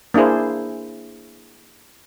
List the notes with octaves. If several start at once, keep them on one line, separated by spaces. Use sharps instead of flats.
A#3 D4 E4 G#4 C5